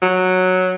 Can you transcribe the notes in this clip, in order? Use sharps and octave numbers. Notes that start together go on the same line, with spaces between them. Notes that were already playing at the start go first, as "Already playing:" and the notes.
F#3